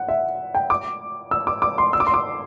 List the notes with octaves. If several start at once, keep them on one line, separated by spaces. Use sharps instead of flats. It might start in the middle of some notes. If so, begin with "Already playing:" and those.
Already playing: F#5
E5
G5
D6
E6
D6
D6
C6
E6
D6
C6
D6